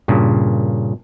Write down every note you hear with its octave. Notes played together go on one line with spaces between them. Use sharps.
G2 A#2 C#3